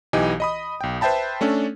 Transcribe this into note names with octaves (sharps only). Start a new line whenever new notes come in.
B1 E3 D#4 G4 D#5 G#5
D#5 B5 D#6
B1 G5
B4 C5 E5 G5 A5 B5
A3 C#4 D4 A4